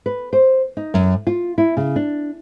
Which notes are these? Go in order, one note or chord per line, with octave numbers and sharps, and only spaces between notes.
B4
C5
D#4
F#2
F4
E4
C#3
D4